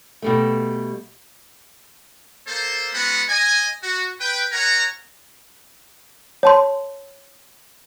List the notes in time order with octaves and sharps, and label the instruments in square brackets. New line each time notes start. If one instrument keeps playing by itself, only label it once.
[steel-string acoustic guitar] B2 G3 A3
[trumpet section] A#3 A4 C5
G#3 B3 C#4 F#4 F#5 B5
D#5 G#5
F#4
B4 G5
A#4 C#5 F#5 G#5 A#5
[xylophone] C#5 A5 C6